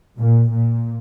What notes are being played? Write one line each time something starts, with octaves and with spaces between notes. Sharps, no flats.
A#2
A#2